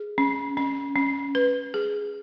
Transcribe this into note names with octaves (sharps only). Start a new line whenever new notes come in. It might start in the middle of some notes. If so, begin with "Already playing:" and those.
Already playing: G#4
C#4
C#4
C#4
B4
G#4